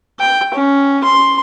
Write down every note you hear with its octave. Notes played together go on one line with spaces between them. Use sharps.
G5
C#4
C6